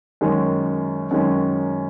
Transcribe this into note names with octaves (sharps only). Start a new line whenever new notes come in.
F#2 D#3 G#3 C#4
F#2 D#3 G#3 C#4